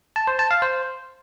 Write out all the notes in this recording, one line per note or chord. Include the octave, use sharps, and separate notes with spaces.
A5
C5
A5
F5
C5